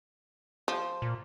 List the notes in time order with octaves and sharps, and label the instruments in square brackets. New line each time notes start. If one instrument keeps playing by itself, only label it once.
[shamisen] F3
[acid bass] A#2